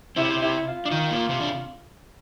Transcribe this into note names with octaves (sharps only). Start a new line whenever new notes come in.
C3 C4 E4
E4
F4
D4
D#3 D#4
A#2 A#3
C3 C4
D4